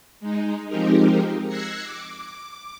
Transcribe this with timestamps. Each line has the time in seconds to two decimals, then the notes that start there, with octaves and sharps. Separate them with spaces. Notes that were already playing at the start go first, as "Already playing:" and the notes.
0.20 G#3 D#4
0.69 F3 G#3 C4 D#4 G4 A#4
1.47 E6 F#6 G#6 A#6 C7 C#7
1.83 D6